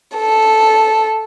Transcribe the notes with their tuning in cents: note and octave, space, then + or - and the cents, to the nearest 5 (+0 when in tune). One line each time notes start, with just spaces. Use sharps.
A4 -5